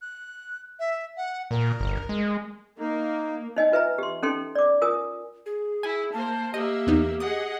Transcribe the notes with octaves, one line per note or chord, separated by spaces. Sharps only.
F#6
E5
F#5
A#2 A#4
G1
G#3
A#3 D#4
D#4 D#5 G#5
F4 B4 E5 G#5 A#5
G4 C6
C#4 D#4 A4 G5 C6
D5 D6
F4 A#4 G#5 D#6
G#4
E4 G#5
A#3 C5 A5
A#3 G4 D#5 E5
E2 B3 D#4
G#4 D#5 F#5 D#6